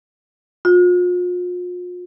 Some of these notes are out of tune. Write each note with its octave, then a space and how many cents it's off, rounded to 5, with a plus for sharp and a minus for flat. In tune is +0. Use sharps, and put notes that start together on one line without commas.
F4 +40